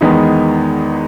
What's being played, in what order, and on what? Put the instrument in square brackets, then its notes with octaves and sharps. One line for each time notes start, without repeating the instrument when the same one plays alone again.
[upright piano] E2 D#3 G#3 B3 D#4